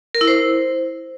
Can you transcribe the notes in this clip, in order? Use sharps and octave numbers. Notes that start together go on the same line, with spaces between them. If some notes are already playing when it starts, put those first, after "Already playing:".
A#4
E4
C5